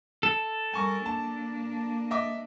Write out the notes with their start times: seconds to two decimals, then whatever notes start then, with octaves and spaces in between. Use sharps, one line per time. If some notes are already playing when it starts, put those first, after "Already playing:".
0.23 A4
0.74 G3 A#4 G#5 C#6
1.06 A#3 D4 A5
2.11 D#5 E5 D6